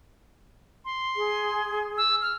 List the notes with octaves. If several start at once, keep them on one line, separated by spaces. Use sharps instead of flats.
C6
G#4
E6
F6